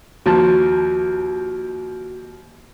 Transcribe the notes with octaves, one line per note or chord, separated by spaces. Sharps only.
D#2 F3 F#4 A5